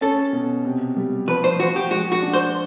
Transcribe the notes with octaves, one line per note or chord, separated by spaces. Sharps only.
C#4 A4
B2
C3
G3
F3 B4
C5
F3 F#4
G4
G#3 F#4
F#4
D4
C5